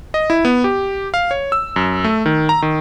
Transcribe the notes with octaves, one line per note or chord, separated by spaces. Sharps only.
D#5
E4
B3
G4
F5
C#5
E6
F#2
A3
D#3
A#5
D#3